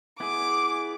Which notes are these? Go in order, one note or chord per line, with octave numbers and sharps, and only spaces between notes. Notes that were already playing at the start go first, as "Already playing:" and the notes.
B3 E4 G#4 D6